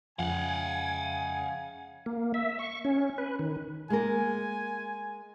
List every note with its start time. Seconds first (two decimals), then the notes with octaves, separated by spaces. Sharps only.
0.19 F2 C#3 F3 G#3 F5 F#5 G#5
2.06 A#3
2.34 E5
2.59 C#6
2.85 C#4
3.18 B4
3.39 D#3
3.90 G#3 A#3 A#4 G#5